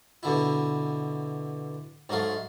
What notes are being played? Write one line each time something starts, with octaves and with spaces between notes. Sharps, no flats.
B2 D3 E4
G#2 F#3 A3 F5